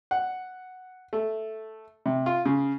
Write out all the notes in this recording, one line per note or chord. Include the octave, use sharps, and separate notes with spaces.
F#5
A3
C3
F4
C#3